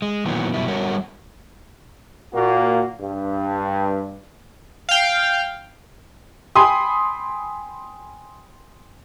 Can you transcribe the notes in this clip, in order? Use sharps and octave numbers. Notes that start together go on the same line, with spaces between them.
G#3
A#2 D#3 E3 F#3 B3
F#2 B2 G3 E4
D3 G3 B3 F#4 A#4 C#5
A#2 A#3 F#4
G2
F5 G5
G5 G#5 B5 C6 D#6